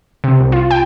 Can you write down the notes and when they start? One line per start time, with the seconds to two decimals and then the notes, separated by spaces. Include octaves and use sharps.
0.24 C3
0.40 C2
0.52 F4
0.71 G5